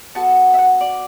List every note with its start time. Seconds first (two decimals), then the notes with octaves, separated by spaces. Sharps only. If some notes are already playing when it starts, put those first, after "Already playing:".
0.15 B3 F#4 A4 A5
0.54 E5
0.59 F#5
0.81 D5